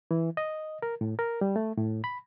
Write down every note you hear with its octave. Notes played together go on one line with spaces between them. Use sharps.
E3
D#5
A#4
A2
A#4
G3
A3
A2
B5